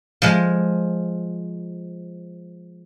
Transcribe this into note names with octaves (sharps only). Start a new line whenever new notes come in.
F3 G#3